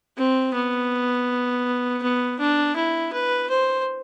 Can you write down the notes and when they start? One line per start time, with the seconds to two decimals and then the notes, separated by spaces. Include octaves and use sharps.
0.17 C4
0.54 B3
2.02 B3
2.39 D4
2.76 E4
3.13 B4
3.50 C5